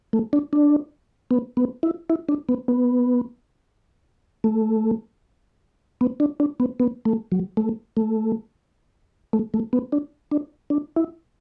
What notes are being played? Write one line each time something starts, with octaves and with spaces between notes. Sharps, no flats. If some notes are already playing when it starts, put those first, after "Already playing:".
A3
D4
D4
B3
B3
E4
E4
D4
B3
B3
A3
B3
D4
D4
B3
B3
A3
F#3
A3
A3
A3
A3
B3
D4
D4
D4
E4